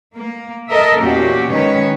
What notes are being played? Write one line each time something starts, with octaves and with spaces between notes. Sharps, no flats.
A#3
A4 A#4 D#5 E5
E2 A#2 C#4 F#4 G4
D#3 G#3 C#4 B4 C#5